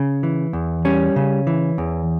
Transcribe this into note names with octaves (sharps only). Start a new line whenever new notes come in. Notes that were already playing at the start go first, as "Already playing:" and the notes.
Already playing: C#3
E3
E2
G3 C#4
C#3
E3
E2